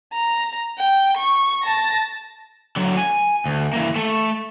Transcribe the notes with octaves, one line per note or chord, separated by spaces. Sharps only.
A#5
G5
C#6
A5 A#6
D3 F#3
G#5
D2
E3 A#3
A3